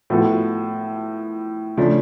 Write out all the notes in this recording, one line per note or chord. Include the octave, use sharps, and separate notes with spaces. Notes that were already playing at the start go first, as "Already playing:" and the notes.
A2 F3 B3 F#4 A4
C#3 F3 A3 D4